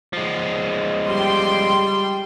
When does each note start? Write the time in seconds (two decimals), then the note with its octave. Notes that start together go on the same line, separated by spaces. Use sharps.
0.13 F3 G#3
1.08 G3 G5 C6